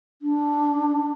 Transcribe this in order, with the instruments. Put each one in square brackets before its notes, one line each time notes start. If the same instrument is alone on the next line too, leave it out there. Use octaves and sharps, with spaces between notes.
[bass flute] D4